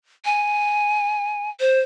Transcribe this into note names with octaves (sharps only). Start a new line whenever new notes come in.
G#5
C5